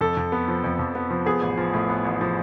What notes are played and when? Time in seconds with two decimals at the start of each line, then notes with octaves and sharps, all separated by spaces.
0.01 F2 A4
0.17 F2
0.32 B3
0.48 F3
0.64 F2
0.79 F2
0.95 B3
1.10 F3
1.26 B3 G#4
1.42 A1
1.57 F3
1.74 A2
1.89 B3
2.05 A1
2.21 F3